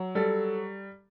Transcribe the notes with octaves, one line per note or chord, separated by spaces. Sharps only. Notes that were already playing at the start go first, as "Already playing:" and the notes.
Already playing: F#3
G3 A4